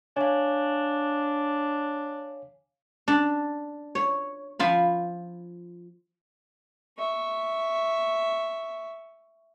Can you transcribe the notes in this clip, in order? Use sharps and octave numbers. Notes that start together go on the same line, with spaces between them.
D4 C#5 F5 G#5
D4
C#5
F3 F4 B5
E5 C#6